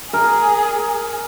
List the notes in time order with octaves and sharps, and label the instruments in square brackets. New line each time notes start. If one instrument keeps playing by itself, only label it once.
[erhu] G#4 [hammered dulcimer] A#4